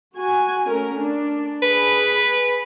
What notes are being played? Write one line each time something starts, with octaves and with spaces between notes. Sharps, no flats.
F#4 G#5
A3 C#4 A#4
D4
G#4 B4 B5